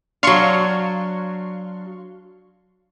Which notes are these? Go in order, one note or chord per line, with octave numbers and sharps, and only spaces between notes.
F#3 D4 F5 C6 C#6